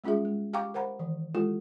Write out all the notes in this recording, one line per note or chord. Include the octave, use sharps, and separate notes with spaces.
G3 G#3 C#4 F4 G#4 E5
G#3
G4 F5 G5 A#5 C#6 D6
A#4 C5 F#5 A#5 B5
D#3 E3
G#3 E4 F4 G4 A4